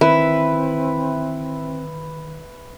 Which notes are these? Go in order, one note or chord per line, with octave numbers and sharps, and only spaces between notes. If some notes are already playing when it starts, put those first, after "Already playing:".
D#3 C4 E4 B4 E5